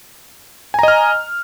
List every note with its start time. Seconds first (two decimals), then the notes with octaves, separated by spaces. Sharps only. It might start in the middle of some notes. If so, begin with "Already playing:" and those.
0.74 G#5
0.79 A#5
0.83 D#5
0.88 F6